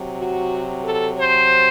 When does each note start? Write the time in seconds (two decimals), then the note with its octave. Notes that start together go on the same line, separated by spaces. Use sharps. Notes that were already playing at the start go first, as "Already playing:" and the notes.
Already playing: C3 F#3
0.19 F#4
0.85 A4
1.18 C5